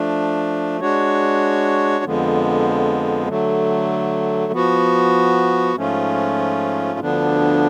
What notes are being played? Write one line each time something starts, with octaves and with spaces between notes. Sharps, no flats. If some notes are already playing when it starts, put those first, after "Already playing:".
Already playing: F3 A3 D4
G#3 D4 F#4 C#5
F2 D3 F3 G#3 B3
D3 F#3 A3
F3 B3 F#4
G#2 F3 A3 C#4 F4
D2 D3 F3 B3 D4